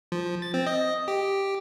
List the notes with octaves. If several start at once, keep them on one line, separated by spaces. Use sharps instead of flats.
F3
A6
C4
D#5
G4